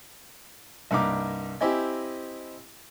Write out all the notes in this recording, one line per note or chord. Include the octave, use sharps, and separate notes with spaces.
C2 G2 A#3 D#4 D6
C4 E4 G4 D#5 G#5